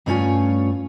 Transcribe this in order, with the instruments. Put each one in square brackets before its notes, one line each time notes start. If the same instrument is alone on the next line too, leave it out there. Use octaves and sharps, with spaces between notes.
[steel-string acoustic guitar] G2 A3 C#4 F4 C#5 G#5